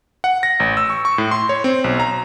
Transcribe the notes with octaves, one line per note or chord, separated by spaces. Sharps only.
F#5
A#6
A1
E6
C#6
C#6
A2
C6
C#5
C4
B1
A#5